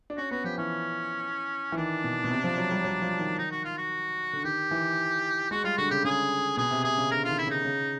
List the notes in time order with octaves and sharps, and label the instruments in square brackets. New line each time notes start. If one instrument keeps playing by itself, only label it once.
[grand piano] D4
[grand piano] C#4 [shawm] F#4
[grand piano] B3 [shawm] F#4
[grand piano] F3 [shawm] G4
[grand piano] E3 [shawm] C#4
[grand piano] E3
[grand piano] D#3 [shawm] D4
[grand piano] B2
B2
C3
F3
F#3
G3
F#3
F3
D#3
[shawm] D#4
F#4
F4
F#4
[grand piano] D3
[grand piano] D#3 [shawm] G4
[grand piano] E3
[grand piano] G#3 [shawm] F#4
[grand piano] G3 [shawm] F4
[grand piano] D3 [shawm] F#4
[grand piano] C#3 [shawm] G4
[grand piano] C#3 [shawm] G#4
[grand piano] B2 [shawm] G#4
[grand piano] C3
[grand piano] C3 [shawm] G#4
[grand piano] C#3
[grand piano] D3 [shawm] A#4
[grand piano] D#3 [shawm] F4
[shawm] E4
[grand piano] C#3 [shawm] D#4
[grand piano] C#3